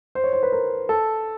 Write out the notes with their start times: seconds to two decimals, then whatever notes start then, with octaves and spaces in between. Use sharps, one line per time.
0.15 C5
0.24 C#5
0.33 C5
0.43 B4
0.52 A#4
0.89 A4